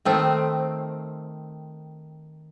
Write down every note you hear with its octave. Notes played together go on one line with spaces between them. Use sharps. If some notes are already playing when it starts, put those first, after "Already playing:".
D#3 A3 C4